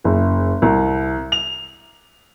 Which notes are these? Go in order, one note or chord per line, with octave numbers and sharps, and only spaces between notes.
F#1
C2
F7